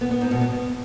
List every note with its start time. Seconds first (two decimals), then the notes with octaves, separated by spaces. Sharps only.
0.01 B3
0.11 B3
0.21 G#2
0.31 B2
0.41 B3